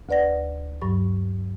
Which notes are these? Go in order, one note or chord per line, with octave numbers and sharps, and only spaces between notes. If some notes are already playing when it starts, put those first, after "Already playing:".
D2 B4 D5 F#5 A#6
G2 F#3 C#6